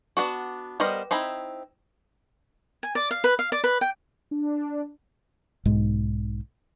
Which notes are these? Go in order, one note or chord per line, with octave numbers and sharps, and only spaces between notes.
B3 D4 F#4
G3 B3 A#4 C5 D#5
C4 D#4 E4 B5
G#5
D5
F5
B4
F5
D5
B4
G5
D4
B1 G#2 G#3